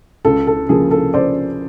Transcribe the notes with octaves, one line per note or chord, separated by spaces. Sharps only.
C#2 A4
A4
C#3 F3 A#3 G#4
A4
C#2 C5 D5